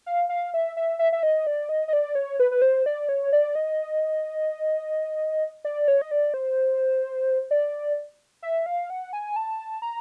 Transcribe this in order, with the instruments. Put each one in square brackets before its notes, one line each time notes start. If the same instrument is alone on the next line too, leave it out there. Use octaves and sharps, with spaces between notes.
[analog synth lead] F5
F5
E5
E5
E5
E5
D#5
D5
D#5
D#5
D5
C#5
B4
B4
C5
D5
C#5
D5
D#5
D5
C#5
D#5
D5
C5
D5
E5
F5
F#5
G#5
A5
A#5